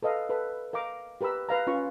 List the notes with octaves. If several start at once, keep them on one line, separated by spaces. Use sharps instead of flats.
A4 B4 D#5 F5
A4 B4 B5
A#4 F5 A#5 D6
G4 A#4 B4 B5 E6
B4 F5 A#5
C#4 F4 B4 C#6